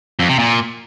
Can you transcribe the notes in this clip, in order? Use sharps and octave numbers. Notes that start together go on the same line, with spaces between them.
F2
C3
A#2